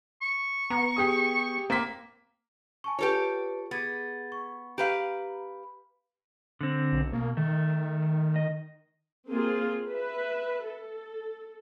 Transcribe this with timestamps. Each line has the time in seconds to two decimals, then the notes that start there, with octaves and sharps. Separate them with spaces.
0.22 C#6
0.70 B3 A#5
0.96 G4 G#4 D#6
1.70 A#3 C4 B6
2.84 G#5 A5 C#6
2.99 F4 G4 A4 B4 C#5
3.71 B3 G#4 G#6 A6
4.32 C#6
4.78 G4 B4 F5 A#5
6.61 D3 C4
6.93 B1
7.13 B2 A#3
7.37 D#3 A3
8.36 D#5
9.30 A#3 C4 F4 G#4
9.89 B4 E5
10.64 A4